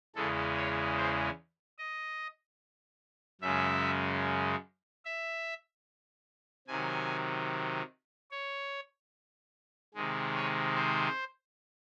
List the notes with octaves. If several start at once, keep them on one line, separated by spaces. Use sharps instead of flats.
E2 C#3 E3 G#3 A4
C#5
C5
D#5
F#2 C#3 G#3 E5
E5
C3 D#3 F#3 G#5
C#5
C3 D#3 G#3
C#5
C5